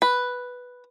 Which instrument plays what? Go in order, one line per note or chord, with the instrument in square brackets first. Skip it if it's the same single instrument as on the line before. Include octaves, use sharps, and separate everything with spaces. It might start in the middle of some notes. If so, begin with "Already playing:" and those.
[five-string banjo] B4